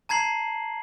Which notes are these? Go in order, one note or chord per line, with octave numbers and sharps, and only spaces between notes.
A5 A#5 G#6 C7 F#7